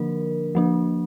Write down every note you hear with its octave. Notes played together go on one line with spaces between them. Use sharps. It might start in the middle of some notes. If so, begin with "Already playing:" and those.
Already playing: D3 F3 A#3 D4 A#4
F3 A#3 D4